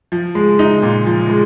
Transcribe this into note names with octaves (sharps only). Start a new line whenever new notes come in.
F3
G#3
D#4
A#2
F3
G#3